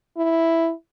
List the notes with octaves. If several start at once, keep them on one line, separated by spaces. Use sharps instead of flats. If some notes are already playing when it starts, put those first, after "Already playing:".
E4